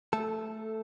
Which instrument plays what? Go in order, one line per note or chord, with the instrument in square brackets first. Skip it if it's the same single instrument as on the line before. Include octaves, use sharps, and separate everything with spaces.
[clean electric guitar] A3 A4